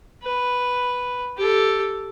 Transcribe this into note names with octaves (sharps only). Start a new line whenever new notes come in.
B4
G4 A4